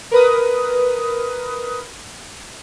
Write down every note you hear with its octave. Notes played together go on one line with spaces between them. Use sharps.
A#4 B4 D#6